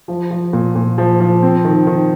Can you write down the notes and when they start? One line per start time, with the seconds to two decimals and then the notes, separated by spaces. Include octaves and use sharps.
0.08 F3
0.31 F3
0.53 A#2
0.75 A#2
0.98 F3
1.20 F3
1.43 C4
1.65 D#3
1.87 D#3